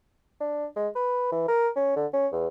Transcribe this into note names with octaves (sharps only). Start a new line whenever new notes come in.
D4
G#3
B4
E3
A#4
C#4
D3
C#4
E2